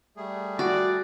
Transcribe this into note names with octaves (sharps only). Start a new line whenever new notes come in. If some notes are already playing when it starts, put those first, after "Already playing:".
G3 A3 G#4
F#4 D5